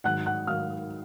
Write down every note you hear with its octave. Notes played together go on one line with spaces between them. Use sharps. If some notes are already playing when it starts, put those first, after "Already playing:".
G#2 D#3 F#3 F#5 F#6
F#5 F#6
G#2 D#3 F#3 F5 F6